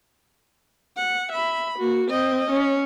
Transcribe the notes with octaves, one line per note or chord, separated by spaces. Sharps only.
F#5
E5 B5
A#3 F#4
C4 D#5
C#4